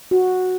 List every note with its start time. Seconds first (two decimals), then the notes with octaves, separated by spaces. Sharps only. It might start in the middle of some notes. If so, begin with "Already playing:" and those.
0.11 F#4